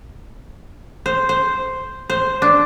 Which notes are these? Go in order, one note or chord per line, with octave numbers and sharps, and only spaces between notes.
C5
C5
C5
D4